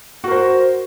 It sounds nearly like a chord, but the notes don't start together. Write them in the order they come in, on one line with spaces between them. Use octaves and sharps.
F#4 A#4 C5